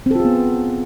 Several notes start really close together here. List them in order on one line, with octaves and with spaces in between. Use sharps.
C4 A4 F4 G#4 B3